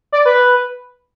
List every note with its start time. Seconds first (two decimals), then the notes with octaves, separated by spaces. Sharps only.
0.12 D5
0.25 B4